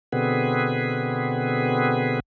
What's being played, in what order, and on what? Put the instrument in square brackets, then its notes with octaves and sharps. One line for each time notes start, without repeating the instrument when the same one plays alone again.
[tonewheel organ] B2 D3 B3 C4 G#4 B4